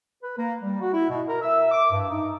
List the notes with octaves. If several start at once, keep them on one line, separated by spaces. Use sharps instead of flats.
B4
A#3
G3
F#4
E4
B2
A#4
E5
D6
G2
D#4